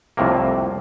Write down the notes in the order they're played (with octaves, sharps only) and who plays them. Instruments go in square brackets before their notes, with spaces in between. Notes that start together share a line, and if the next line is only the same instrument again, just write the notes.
[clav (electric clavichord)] C2 F2 A2 C3 A#3